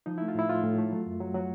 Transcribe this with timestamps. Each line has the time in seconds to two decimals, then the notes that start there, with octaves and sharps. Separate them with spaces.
0.06 F3 D#4
0.18 A3 E4
0.28 F4
0.35 A2 E4
0.49 A2 F4
0.64 A2
0.78 A3
0.92 F#3
1.06 F#2
1.20 F#3
1.34 F#3 F#4